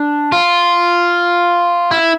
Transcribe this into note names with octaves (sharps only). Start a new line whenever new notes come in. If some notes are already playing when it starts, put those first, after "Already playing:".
Already playing: D4
F4
E4